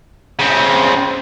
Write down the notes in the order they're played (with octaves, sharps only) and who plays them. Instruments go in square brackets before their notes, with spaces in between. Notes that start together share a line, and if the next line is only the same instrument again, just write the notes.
[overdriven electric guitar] C#3 C4